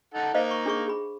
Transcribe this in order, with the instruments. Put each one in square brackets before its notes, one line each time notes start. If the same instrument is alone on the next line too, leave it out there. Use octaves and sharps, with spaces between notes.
[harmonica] D#4 A4 F#5
[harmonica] A#3 D#4 [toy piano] C5 D#5 F5
[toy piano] C#6
D4 G#4 C#6
G#4 B5